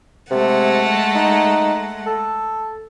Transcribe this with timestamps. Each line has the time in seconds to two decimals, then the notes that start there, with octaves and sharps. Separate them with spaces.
0.31 C3 G#3 A3 F#5
1.15 D#4
2.07 A4